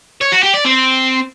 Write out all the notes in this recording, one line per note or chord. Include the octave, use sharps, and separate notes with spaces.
C#5
F#4
G4
D5
C4